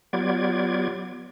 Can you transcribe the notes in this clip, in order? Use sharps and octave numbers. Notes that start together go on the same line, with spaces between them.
F#3 B3 F4 G4 D5 G#6